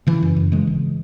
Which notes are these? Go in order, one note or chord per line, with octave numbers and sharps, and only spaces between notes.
C#3 E3
F#2
F#2
C#3 E3 G#3
G#1